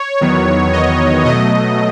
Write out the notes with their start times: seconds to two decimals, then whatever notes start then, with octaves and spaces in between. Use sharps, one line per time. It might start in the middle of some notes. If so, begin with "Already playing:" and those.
Already playing: C#5
0.21 E2 D#3 F#3 B3
0.73 D#5
1.25 B2 F#3 A3 D#5